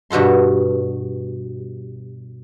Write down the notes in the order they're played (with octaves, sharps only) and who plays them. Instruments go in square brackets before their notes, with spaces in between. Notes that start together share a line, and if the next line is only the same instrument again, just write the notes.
[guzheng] G2 B2 F#4 A4 C6